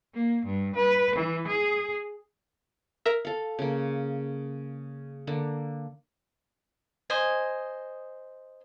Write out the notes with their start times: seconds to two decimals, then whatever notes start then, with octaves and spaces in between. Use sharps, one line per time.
0.14 A#3
0.45 G2
0.75 B4
1.15 E3
1.47 G#4
3.05 A#4 E5
3.25 A4 F5
3.59 C#3 A#3
5.27 D3 A#3
7.10 C5 D#5 G#5